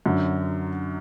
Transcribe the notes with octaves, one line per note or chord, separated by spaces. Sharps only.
F#2 D3 F#3